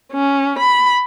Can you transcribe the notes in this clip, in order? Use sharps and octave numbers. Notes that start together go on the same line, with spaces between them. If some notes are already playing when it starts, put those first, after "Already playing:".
C#4
B5